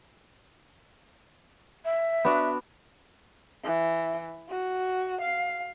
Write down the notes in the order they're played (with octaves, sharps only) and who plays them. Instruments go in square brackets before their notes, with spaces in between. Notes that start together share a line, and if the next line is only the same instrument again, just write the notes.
[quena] E5
[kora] B3 D4 F#4
[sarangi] E3
F#4
F5